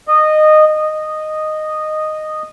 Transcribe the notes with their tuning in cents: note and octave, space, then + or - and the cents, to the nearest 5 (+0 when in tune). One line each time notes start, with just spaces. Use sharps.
D#5 -15
D#5 -10